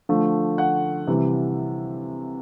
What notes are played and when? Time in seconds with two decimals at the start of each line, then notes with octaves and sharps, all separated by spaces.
0.09 D3 F3 A3
0.58 F#5
1.07 C3 E3 G3